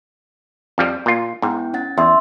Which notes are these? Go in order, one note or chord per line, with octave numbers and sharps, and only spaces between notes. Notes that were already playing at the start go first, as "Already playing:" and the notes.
F2 F3 G3
A#2 F4
G#2 B3 E4 G5
C#4 F#5 A6
E2 E5 C6 E6